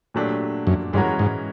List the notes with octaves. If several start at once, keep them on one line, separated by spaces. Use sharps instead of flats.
A#2 F#3 A3 D4 G4
F#2
G2 E3 G#3 C#4 F#4 A#4
G#2